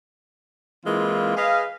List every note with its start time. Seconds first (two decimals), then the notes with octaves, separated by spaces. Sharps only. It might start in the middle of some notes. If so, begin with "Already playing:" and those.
0.85 E3 G#3 A#3 C4 E4 F4
1.37 G#4 B4 D#5 F5